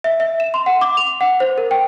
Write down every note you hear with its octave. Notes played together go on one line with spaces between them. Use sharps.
E5
E5
E7
C6
F#5
D6
F7
F#5
C5
A#4
G5